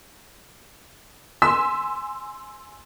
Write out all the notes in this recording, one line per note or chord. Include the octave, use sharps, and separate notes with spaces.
G#5 C6 E6 B6